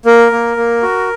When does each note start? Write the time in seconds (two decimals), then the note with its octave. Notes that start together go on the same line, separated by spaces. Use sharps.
0.06 A#3 A#4
0.32 A#3
0.57 A#3
0.83 F#4